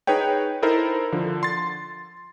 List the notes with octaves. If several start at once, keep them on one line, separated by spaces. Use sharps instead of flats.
D#4 G#4 B4 C#5 G5
D#4 E4 A4 A#4 C5
D3 F3
C6 A6